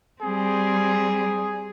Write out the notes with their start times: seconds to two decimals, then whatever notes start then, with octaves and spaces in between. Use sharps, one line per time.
0.22 G3 C4 G#4